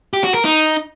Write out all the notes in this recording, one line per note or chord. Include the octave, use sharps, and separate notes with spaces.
G4
F#4
A#4
D#4